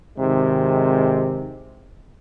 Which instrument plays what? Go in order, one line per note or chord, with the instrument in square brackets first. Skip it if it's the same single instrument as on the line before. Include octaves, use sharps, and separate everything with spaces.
[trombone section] G#1 C3 D#3 G#3